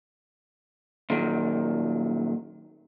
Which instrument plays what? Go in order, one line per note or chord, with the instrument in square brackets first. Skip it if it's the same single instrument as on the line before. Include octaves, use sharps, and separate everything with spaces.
[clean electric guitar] A#2 D#3 F#3